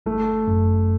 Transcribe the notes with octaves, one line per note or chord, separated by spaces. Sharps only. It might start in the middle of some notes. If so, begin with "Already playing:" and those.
G1 A3
F#2